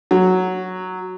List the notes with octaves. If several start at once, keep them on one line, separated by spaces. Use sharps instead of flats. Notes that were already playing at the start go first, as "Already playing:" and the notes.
F#3